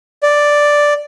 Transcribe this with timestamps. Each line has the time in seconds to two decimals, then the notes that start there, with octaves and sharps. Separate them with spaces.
0.23 D5